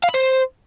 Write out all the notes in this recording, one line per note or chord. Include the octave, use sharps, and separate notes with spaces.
F5
B5
C5